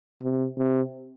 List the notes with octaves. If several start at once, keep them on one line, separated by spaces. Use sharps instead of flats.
C3
C3